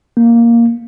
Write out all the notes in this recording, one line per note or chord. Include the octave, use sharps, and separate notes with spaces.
A#3